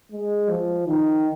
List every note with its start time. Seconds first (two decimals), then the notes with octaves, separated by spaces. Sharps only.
0.12 G#3
0.49 F3
0.87 D#3